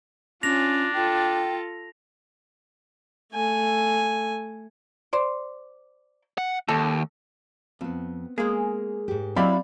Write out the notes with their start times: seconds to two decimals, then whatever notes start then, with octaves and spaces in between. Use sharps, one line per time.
0.43 C#4 D4 F4 A#6 F7
0.94 F4 A4 G5
3.33 A3 G#5
5.13 C5 D5
6.38 F#5
6.69 D#2 A4
7.81 F2 B3 C4
8.38 G#3 A#3 G#4
9.08 G#2 G4
9.36 F#3 C4 E4 D5 F5 G5 B5